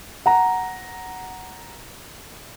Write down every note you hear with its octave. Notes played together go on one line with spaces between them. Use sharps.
F#5 A#5